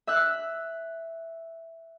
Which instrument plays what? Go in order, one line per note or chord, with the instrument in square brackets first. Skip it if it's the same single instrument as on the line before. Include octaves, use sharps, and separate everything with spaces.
[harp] E5 E6 F#6